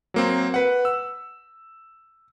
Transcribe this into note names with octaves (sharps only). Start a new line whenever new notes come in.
F#3 A#3 C4
B4 F#5
E6